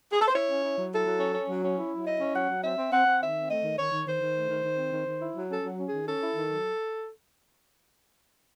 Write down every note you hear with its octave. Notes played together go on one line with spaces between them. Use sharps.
G#4
A4
C5
E4 C#5
C#4
E4
F#3
E4 A4
F#3
C#4
C#4
F#3
C#4
E4
F#3
E4 D#5
C#4
F#3 F#5
F#3
C4 E5
C4
C4 F#5
C4
D#3 E5
C4
A3 D#5
D#3
D#3 C#5
D#3
D#3 C5
D#3
A3
D#3
D#3
C4
D#3
D#3
E4
F#3
C#4 A4
F#3
C#4
D#3 G#4
C#4 A4
E4
D#3
F#3